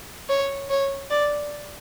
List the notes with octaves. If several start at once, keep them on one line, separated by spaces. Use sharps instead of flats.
C#5
C#5
D5